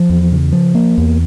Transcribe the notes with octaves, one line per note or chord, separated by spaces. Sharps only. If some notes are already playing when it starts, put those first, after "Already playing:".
Already playing: F3
E2
C#3
F3
A#3
E2